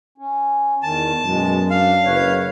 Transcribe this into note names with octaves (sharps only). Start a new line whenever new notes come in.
C#4
E2 D#3 A5
F#2 B2 G#3
D4 F5
F#1 B4 C#5